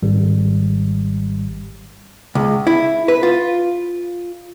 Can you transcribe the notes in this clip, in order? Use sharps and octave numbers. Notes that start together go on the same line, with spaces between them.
G#1 G3
C#2
E4
B4
F4